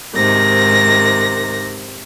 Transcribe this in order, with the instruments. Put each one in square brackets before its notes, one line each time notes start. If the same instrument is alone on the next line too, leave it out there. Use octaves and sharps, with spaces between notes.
[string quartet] G#2 C3 D#3 A#6